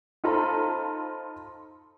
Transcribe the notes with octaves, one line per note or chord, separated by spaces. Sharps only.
D#4 F4 A4 C5 A#5 B5